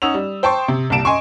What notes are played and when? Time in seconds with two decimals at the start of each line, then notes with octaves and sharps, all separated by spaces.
0.02 C#4 D#4 F#5 D#6 E6 F7
0.14 G3
0.43 C5 G5 A5 C6 C#6
0.68 C3
0.90 C2 A#2 G4 A5 D7 E7
1.05 D#5 G#5 C6 C#6